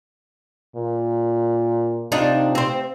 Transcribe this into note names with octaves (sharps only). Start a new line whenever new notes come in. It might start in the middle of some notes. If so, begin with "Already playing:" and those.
A#2
C3 D4 D#4 F4
C4 C5